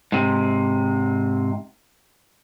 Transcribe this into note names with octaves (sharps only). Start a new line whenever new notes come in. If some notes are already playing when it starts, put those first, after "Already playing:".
G#2 C3